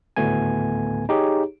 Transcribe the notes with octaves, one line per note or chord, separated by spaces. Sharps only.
G#1 D2 A2 A3 B3 G#5
D#4 G4 G#4 C#5